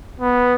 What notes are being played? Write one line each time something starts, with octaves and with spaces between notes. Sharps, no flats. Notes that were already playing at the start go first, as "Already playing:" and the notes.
B3